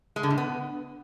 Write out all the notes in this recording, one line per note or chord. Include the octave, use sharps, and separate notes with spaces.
G#3
D3
A2
B3